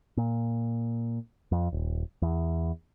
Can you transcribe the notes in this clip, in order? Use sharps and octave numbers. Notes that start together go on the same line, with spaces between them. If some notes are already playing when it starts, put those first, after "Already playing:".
A#2
F2
D#1
E2